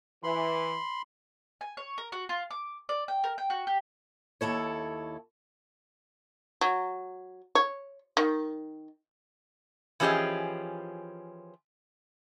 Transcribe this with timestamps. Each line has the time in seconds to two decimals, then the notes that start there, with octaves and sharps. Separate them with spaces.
0.24 E3 B5 C6
1.61 G#5
1.77 C#5
1.98 A#4
2.12 F#4
2.29 F4
2.51 D6
2.89 D5
3.08 G5
3.24 A#4
3.38 G5
3.50 F#4
3.67 G4
4.41 D#2 E4 A4 C#5
6.61 F#3
7.55 C#5
8.17 D#3
10.00 E3 F3 C#4 G4 G#4 D#5